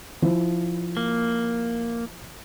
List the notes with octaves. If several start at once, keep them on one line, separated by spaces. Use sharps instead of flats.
F3 E4 C5
A#3